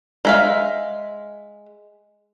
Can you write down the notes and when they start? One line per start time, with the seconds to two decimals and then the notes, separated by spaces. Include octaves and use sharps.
0.25 G#3 E5 F5